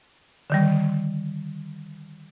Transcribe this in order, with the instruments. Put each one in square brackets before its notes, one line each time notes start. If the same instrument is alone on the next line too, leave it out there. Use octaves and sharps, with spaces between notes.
[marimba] D3 D#3 G3